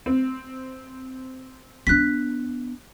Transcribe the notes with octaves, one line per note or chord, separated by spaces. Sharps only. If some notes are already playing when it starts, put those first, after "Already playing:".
C4
B3 D4 F#6 B6